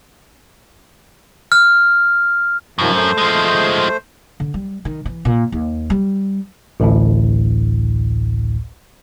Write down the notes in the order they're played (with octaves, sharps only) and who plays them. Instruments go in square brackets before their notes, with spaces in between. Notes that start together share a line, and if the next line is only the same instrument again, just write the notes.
[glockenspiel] F6
[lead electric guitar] F#2 [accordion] C3 D#3 F3
[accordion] A3 C5
[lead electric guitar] F3 G#3
[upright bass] D3
G3
D#3
E3
A#2
D#2
G3
[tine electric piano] A1 D2 A2